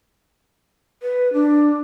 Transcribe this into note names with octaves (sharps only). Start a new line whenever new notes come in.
B4
D4